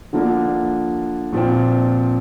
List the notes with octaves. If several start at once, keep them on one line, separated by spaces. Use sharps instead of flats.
D3 F3 A#3 D4
A#2 F3 C4